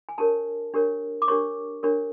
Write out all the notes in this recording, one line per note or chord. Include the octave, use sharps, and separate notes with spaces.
G#5
D4 G4 A#4 C#5 A5
D4 G4 A#4 C#5
D6
D4 G4 A#4 C#5 C#6
D4 G4 A#4 C#5